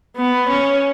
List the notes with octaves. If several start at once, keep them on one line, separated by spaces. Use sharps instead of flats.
B3
C#4